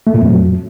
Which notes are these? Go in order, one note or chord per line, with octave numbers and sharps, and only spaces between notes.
A3
A#2
F2
F#3